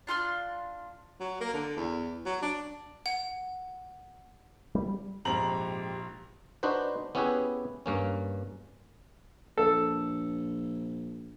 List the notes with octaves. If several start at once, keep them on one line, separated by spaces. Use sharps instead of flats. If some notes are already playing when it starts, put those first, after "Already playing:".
D4 F4 C6 F6
F#3
A#3
D3
E2
F#3
D4
F#5
G3
A#1 F2 G#2 G4 A#5 F#7
D4 D#4 F#4 B4 C5
B3 C#4 E4 G4 G#4 B4
G2 A#3 C#4
A#1 A4